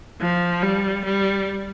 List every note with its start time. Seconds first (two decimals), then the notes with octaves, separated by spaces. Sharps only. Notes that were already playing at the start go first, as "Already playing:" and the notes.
0.21 F3
0.63 G3
1.04 G3